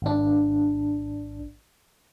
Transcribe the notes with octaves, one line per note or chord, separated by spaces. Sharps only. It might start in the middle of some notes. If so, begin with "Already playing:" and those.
G#1 D4